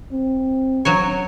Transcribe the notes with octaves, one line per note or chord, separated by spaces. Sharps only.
C4
F#3 F#4 C#5